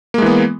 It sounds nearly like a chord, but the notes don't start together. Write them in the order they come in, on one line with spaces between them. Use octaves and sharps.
A#3 G#3 E3 B3